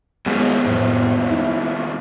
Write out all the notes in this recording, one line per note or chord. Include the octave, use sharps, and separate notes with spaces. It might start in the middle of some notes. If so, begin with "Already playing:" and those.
D#2 B2 G#3
F2 A2 B3
D#4 E4